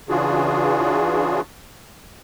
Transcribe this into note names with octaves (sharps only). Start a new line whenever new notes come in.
C#3 E3 D4 F4 F#4 G#4